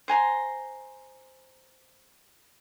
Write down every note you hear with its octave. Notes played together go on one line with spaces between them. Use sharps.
C5 G#5 A#5 C6